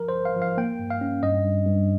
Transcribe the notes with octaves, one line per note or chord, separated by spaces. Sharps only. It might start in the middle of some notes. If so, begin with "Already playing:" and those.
Already playing: F3 A#4
C5
G1
F5
F3
F5
A#3 G5
G2
F5
C#4
G2 D#5
G2
G2